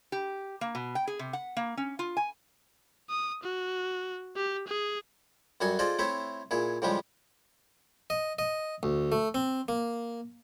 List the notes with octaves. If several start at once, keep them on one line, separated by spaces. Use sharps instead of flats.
G4
A#3
B2
G5
G#4
C3
F#5
A#3
C#4
F4
G#5
D#6
F#4
G4
G#4
F#2 G3 F#4 A4 G#5 D#6
F4 G#4 A4 C5 D5 D#5
A3 C4 E4 C5 C#5 E5
A#2 E4 G#4
A2 C#3 F3 G3 G#3 G4
D#5
D#5
D2
A3
C4
A#3